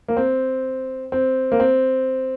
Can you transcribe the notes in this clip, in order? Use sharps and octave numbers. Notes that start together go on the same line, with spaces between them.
A#3
C4
C4
A#3
C4